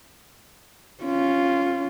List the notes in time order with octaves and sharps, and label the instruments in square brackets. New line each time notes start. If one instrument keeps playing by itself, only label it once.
[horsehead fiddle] C#4 F4